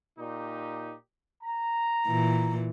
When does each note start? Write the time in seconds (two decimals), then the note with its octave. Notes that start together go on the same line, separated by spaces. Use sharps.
0.18 A#2 D#4 G4
1.41 A#5
2.07 A#2 E3